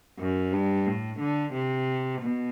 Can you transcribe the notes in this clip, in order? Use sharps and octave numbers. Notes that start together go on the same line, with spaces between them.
F#2
G2
A2
D3
C3
B2